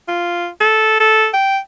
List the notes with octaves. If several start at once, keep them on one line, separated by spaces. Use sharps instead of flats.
F4
A4
A4
G5